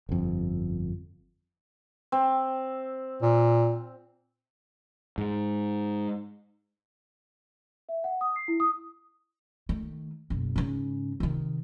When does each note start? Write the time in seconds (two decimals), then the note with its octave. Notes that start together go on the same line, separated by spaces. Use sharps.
0.09 G1 F2
2.12 C4
3.22 A#2
5.18 G#2
7.89 E5
8.04 F#5
8.21 D#6
8.36 C7
8.48 E4
8.60 D#6
9.69 D#3 A3
10.30 F#1 B2
10.56 G#2 C#3
11.20 C3 D#3